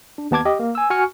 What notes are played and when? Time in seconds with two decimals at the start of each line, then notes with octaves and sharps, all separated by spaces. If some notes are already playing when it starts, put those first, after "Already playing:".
0.18 D4
0.31 D#2 B3 A5 D6 G#6
0.45 G4 D#5
0.59 A#3
0.75 G#5 E6
0.90 F#4 G#5 C#6 F6 C#7